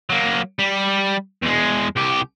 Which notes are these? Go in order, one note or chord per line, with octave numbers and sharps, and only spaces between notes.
F#3 A#3
G3
E2 G#3
C2 G4